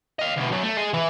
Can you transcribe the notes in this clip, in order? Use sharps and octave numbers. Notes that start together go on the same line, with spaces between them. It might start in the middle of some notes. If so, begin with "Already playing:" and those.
D#5 F5
D2 B2
F#2 F#3
A3
G#4 D#5
E3 E4